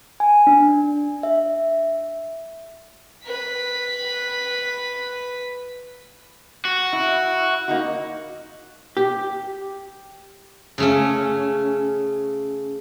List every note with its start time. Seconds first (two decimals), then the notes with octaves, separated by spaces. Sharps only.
0.20 G#5
0.47 D4
1.23 E5
3.26 B4 B6
6.65 F#4
6.93 E4
7.68 A#3 D#4 F#4
8.97 G4
10.78 C#3 A3 C#4